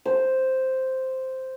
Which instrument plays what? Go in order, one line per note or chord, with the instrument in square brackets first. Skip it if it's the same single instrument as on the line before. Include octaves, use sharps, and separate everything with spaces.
[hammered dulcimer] C5